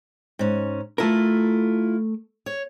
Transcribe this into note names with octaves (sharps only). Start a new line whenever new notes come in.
G#2 C#4
A3 E4 F4 A4 A#4
C#5